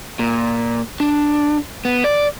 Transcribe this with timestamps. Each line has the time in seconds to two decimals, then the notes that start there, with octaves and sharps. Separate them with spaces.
0.19 A#2
1.00 D4
1.85 B3
2.04 D5